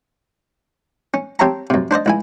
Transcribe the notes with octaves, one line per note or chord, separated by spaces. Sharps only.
C#4
C4 G4 C#5 E5 A5 A#5
F#2 C3
D4 C5 D5 D#5
C#2 E4 G#5